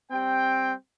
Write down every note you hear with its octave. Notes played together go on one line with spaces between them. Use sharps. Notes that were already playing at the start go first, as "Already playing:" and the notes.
G3 C4 G5